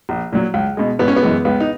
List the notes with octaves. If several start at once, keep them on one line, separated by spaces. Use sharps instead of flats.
A#1
A#2 F#3
C#2
B2 G#3
G#1 B3
C#4
B3
F#2 E3 G#3
C#2 B3
D#4